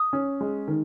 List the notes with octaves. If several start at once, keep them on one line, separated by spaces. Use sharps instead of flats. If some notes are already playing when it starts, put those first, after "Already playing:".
Already playing: D#6
C#4
G#3
D#3